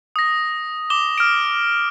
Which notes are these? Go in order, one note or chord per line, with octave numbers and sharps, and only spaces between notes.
D#6 A#6
D6 E7 G7
F6 D7